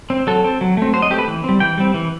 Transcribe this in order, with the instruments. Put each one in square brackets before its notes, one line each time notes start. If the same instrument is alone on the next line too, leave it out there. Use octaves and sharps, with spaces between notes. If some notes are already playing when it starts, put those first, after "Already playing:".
[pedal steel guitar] C4
F#3 A4
C4
F#3
A3 C4
F#3 C5
D#5
A3 C4 G4
B4
E3
G3 C4
E3 G5
G3 C4
E3